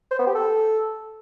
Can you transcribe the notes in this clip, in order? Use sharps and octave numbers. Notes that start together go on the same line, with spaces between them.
C5
B3
G4
A4